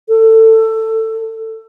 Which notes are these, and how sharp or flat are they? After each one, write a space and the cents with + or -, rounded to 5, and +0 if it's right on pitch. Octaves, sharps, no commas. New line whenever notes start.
A4 +20